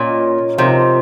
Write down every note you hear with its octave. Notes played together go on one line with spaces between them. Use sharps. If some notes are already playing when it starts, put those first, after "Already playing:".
Already playing: A#2 C#4 F4 A#4 D#5
C3 F3 C4 D#4 A#4